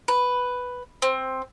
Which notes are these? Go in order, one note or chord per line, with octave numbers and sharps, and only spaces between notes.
B4
C4